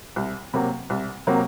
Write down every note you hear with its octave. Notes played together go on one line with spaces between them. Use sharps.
C2
C3 F#3 A#3
C2
C3 F#3 A#3